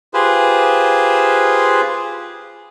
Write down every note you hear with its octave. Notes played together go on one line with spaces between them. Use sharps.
F4 G4 G#4 B4 C5